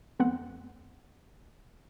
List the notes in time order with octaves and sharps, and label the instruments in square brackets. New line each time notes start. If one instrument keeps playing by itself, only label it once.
[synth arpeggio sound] F2 A3 B3 C4 F#5